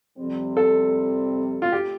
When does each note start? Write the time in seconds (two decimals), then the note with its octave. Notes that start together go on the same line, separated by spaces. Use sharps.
0.18 F2 C3 G3 C4
0.57 A4
1.62 F4
1.72 G4